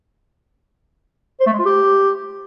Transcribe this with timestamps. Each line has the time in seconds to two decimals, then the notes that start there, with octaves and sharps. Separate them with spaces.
1.40 C5
1.47 A3
1.53 G#3
1.59 F4
1.66 G4